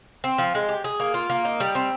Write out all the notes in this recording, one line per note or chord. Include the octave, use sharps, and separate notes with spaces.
C4
F3
G#3
G4
G#4
A#3
F4
A#3
D#4
G3
C4